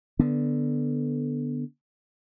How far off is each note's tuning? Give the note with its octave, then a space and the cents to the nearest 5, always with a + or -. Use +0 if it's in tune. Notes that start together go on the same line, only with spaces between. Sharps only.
D3 +0 B3 -5